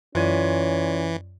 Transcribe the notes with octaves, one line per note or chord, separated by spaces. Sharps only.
F#2 E3 C#4 F4 C#5 D5